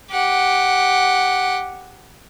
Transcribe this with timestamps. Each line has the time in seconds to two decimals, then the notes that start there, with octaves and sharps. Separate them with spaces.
0.11 G4 F#5